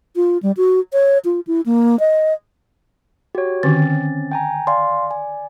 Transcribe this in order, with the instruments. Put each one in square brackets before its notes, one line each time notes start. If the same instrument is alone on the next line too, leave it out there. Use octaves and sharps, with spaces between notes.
[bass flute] F4
G3
F#4
C#5
F4
E4
A#3
D#5
[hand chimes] F#4 [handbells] G4 C#5
[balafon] D3 D#3 [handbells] C4 C#4 [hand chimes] A6
[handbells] G5 G#5 A#5
[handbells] D5 [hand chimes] F5 G#5 C6
[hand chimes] G#5